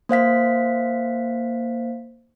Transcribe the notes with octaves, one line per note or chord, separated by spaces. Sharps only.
A#3 C5 F5 B6